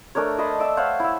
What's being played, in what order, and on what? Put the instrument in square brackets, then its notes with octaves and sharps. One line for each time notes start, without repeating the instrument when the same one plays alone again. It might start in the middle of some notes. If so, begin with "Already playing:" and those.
[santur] A3 D4 A#4 C#5
D#5 A5 B5 C6
D5 E5 E6
C5 C#5 F5 F#5
E4 E5